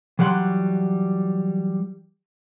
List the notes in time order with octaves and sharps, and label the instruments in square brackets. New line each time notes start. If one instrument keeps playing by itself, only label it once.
[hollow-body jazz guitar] E3 F#3 G3 F#5 C6